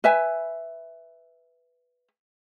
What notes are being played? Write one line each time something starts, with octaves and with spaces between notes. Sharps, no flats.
B4 E5 G#5